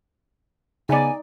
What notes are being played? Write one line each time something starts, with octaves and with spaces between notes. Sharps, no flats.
C#3 B3 D#4 D5 G#5